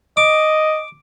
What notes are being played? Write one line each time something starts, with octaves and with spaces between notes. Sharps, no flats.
D#5 D6